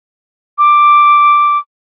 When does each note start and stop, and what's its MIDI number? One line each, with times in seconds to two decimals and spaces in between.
0.58 1.58 86